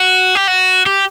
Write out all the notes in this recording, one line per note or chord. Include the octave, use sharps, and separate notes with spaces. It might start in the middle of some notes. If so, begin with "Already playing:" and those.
Already playing: F#4
G4
F#4
G4